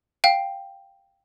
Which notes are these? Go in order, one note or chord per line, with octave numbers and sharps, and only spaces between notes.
F5 G5